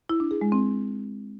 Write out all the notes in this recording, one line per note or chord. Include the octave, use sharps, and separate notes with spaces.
E4
D4
G#4
G#3
C4